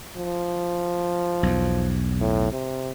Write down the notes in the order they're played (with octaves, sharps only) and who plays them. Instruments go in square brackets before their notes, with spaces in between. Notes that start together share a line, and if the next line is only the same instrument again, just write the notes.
[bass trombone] F3
[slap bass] B1 E2
[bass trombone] A2
C3